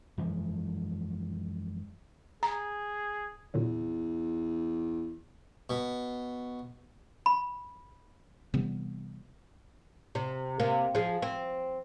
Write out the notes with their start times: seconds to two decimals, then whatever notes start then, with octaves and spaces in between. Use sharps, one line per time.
0.18 F#2 E3 F3 G#3
2.43 G#4 A#5
3.54 E2 A#2 D3 F#3
5.70 B2
7.26 B5
8.54 C3 E3 G3 B3
10.15 C3
10.60 C3 A#3
10.95 F3 G#4
11.22 C4